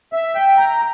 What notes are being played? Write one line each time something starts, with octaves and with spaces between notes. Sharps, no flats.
E5
G5
A#5